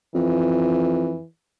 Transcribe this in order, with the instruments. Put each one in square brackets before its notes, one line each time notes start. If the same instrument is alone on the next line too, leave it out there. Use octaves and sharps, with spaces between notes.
[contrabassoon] F2 [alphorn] E3